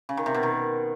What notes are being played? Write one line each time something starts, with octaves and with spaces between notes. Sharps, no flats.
C#3
D#3
C3
B2
D#3